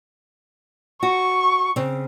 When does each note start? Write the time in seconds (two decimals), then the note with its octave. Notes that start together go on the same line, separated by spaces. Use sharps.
1.03 F#4 C#6
1.76 C#3 C4